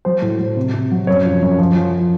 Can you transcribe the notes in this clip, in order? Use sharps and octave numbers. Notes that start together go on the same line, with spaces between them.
F#3 C5
A2
A2
C3
C3
F#3
F#2 C#5
F3
F#2
F3
F3